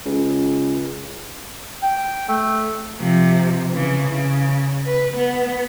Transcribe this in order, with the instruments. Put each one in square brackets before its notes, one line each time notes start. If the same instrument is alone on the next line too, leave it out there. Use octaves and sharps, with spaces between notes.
[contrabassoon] C#2
[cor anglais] G5
A3
[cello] C3 F3
C#3 E3
C#3
B4
B3